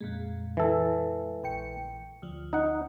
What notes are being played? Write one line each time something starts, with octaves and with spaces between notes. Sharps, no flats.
F2 A#2 G#3
E3 A4
A#1 G5 C#7
D2 F3
D#4 F#5